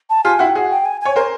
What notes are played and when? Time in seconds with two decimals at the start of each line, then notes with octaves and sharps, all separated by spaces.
0.10 A5
0.24 F4 G4 G#5
0.39 E4 F#4 G5
0.55 F#4 G#4 F#5
0.70 G5
0.85 G#5
1.01 C#5 G#5
1.16 A#4 C5 G#5